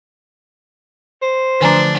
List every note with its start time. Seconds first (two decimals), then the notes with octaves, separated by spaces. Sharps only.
1.22 C5
1.60 D3 F3 A3 D4 B4 G#5 A#5